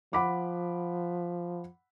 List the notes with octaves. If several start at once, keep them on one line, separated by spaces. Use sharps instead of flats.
F3 F#5 B5 D6